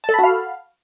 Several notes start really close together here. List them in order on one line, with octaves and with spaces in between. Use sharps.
A5 A4 B5 F#4 F5